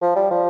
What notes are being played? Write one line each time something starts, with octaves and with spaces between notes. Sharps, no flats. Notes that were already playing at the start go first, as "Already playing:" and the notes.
F3
G3
F3